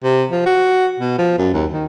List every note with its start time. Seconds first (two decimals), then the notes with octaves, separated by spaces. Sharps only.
0.04 C3
0.31 F3
0.46 F#4
1.00 B2
1.18 F3
1.39 F#2
1.54 D#2
1.72 D#3